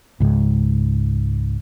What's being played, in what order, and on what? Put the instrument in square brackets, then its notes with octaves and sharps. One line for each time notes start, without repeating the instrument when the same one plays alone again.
[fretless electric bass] C#2 G#2